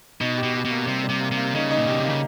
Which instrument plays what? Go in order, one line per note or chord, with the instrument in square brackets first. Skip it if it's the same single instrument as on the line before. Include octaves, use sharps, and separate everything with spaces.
[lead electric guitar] B2 [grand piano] D#4
[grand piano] G4
[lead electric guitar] B2
[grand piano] G4
[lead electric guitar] B2
[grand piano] A#3
[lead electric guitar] C3 [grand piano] G3
[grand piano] G3
[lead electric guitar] C3
[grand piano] A#3
[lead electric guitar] C3
[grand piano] A#3
[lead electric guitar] C#3 [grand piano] D#4
[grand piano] D#4
[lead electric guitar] A#2
[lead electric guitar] B2 [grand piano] G4
[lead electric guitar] C3 [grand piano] A#3
[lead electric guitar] C#3